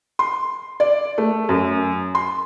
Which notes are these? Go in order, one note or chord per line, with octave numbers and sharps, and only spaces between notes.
C6
D5
A3
F#2
C6